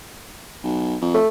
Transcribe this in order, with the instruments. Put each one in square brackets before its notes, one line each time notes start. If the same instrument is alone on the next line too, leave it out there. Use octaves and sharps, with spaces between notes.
[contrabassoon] B1
F2
[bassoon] A3